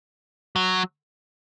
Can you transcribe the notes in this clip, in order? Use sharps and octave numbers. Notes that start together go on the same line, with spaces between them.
F#3